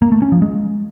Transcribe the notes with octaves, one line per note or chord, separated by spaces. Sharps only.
A#3
A3
C#4
F3
G#3